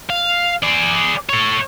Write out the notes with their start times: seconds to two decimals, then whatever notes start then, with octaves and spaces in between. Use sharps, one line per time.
0.10 F5
0.63 G#4 D5
1.29 A4 C#5